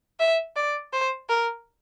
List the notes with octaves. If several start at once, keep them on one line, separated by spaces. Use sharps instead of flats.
E5
D5
C5
A#4